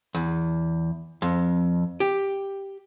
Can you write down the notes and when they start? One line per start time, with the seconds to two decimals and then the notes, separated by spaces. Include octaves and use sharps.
0.15 E2
1.22 F2
2.00 G4